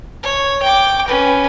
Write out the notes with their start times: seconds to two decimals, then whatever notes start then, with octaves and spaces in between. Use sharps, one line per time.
0.23 C#5
0.62 G5 D6
1.07 C#4 B4